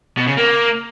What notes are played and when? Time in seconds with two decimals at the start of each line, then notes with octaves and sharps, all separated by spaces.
0.17 B2
0.27 C#3
0.37 A#3